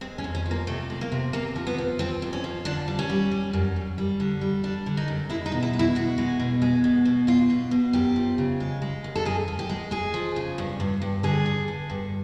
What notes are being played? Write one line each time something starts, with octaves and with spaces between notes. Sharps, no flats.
G#3 C4
C#4
F2
C#4
F3
A#3
C3 A3
G#3
A#3
C3
C3 A#3
F3
B3
F3
F3 C4
F2
C#4
F3
D3 D4
G3
C#4
G3
G3
F#2
F#2
G3
D3
G3
G3 D4
D3
D#4
F#2
G#3 E4
D#4
B2
E4
G#3
E4
B2 F#4
G#3
B2
G#3
B2
B2
B2 F4
B2
B2
F#2 G4
F3
C#3
G#3
G#3
F#2
A4
F#2 G#4
F#2
G4
G#3
G#3 G#4
F3
C#3
G2
G2
G2
D3 G#4
D3
G2
G2